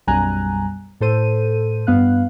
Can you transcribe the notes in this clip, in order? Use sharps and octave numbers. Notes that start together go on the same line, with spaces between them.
B1 F#2 G3 G#5 A#5 F#6
A2 A4 C5 D#7
G2 B3 F5 F#6